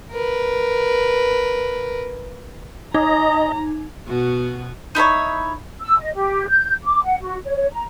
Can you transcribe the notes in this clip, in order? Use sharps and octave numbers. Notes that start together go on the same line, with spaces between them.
A#4 B4
D#4 D#5 A#5
B2 B3 F#4
D#4 E4 A4 C#5
E6
D#5
G4
G6
D6
F#5
F#4
C#5
C#5
A#5